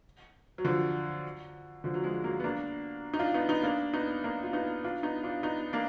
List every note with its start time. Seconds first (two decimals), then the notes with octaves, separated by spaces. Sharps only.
0.58 F#3
0.65 D3 F3
1.84 D3 F3
1.94 F#3
2.04 F3 G#3
2.24 F#3 A#3
2.40 B3
2.44 A#3 D4
3.13 D#4
3.19 D4 F4
3.34 B3 D#4
3.49 B3 D#4
3.63 A#3 D4
3.93 B3 D#4
4.24 A#3 D4
4.43 F4
4.53 B3 D#4
4.84 D4 F4
5.03 B3 D#4
5.23 D4 F4
5.43 B3 D#4
5.73 A#3 D4